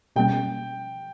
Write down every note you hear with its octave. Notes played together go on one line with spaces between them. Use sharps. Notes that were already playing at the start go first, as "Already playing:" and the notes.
B2 G3 A#3 C#4 G5